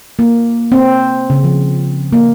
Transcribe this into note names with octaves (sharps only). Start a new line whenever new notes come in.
A#3
C4
C#3
F3
A#3